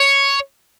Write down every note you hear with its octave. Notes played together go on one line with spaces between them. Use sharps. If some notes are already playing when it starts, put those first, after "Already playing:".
Already playing: C#5